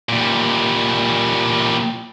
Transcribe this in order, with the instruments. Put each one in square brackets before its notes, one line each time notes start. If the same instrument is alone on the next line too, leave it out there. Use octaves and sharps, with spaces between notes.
[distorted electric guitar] A#2 G3